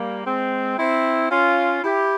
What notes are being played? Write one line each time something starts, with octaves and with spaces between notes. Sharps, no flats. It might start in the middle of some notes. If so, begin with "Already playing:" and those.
Already playing: G3 A#3
G#3 C4
C4 E4
C#4 F4
E4 G4